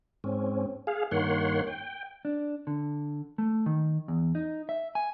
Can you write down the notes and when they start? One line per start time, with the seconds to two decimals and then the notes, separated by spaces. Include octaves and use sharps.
0.24 G#2 C4 C#4
0.87 G#4 F5
1.11 G2 D#3 A#3 C#5 F#5 C6
1.67 G5
2.25 D4
2.67 D3
3.38 A3
3.66 D#3
4.08 E2
4.35 D#4
4.69 E5
4.95 G#5